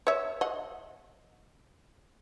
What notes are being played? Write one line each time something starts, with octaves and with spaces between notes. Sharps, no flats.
C#5 E5
D#5 F#5